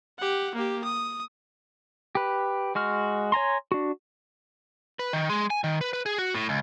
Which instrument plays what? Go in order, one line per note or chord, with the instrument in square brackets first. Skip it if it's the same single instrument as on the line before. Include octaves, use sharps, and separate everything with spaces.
[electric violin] G4 F#5
A#3 G4
D#6
[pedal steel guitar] G4 B4
G#3 F#4 F6
C#5 G#5 A#5 C6
D4 F#4
[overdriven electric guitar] B4
D#3
G#3
G#5
D#3
B4
B4
G#4
F#4
A2
C#2